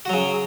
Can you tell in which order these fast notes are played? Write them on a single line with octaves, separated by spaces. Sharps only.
F#4 F#3 C#3